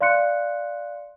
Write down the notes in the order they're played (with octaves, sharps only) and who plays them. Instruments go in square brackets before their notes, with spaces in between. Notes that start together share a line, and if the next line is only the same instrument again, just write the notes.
[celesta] D5 F5 C6 F#6 C#7